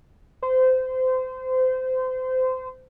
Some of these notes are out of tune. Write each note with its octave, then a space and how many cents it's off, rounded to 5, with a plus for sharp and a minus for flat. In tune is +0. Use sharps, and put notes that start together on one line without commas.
C5 -25